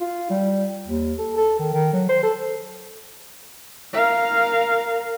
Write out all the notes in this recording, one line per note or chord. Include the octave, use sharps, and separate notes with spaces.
F4
G3
D#2
A4
A4
D#3
D#3
F#3
C5
A4
A#4 F5